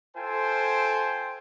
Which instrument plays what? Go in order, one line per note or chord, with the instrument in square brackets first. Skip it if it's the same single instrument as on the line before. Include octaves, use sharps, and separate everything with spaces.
[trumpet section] F4 A4 C5 G5 G#5